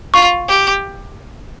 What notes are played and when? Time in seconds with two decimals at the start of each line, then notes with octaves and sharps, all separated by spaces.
0.14 F4 C#6
0.48 G4